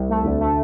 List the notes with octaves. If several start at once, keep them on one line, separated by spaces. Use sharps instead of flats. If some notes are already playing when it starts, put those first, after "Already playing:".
Already playing: C2
A3
D2
A3